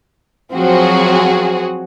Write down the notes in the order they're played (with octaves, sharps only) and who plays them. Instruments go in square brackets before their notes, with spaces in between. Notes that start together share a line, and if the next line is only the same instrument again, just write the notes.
[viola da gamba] F3 F#3 [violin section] C4 F#4 G#4